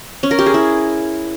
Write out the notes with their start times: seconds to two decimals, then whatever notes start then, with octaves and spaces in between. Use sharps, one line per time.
0.23 C#4
0.31 A#4
0.39 G4
0.46 G#4
0.54 E4